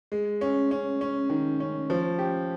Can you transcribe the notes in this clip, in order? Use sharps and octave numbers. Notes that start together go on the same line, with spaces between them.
G#3
C#4
C#4
C#4
D#3
C#4
F3
G4